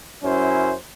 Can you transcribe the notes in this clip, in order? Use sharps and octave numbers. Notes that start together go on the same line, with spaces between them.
F#2 F#3 C#4 E4 C5